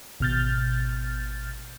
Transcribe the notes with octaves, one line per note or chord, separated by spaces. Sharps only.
G#1 B2 F6 G6 A6